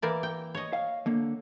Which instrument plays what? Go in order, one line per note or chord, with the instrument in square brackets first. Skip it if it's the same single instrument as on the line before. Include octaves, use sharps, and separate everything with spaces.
[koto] E3 A#3 D5
G5
C#5 D#5
[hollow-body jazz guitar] F5
D3 A#3